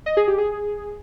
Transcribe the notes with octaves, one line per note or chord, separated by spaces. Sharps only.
D#5
G#4
G4
G#4